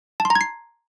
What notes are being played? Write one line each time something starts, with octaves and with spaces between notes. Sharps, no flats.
A5
C6
A#5
G#6
C7